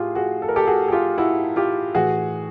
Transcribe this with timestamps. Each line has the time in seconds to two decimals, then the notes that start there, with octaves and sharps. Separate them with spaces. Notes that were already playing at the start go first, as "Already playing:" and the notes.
Already playing: A2 F4 G4 G#4
0.15 F#4 G#4
0.42 A4
0.49 A#4
0.56 G4 A4
0.67 F#4 G#4
0.88 G#4
0.92 F4 G4
1.18 E4 F#4
1.56 F4 G4
1.95 A2 E3 F#4 G#4